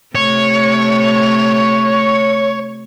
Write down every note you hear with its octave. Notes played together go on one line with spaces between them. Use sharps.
C3 A3 C#5